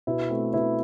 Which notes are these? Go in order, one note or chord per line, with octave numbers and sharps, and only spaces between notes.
B2 E4
A3 C4
B2 E4